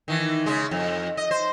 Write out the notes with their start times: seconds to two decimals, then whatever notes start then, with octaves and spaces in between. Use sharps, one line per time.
0.08 D#3 E3
0.46 C#3 G#3
0.71 F2
1.17 D#5
1.31 C5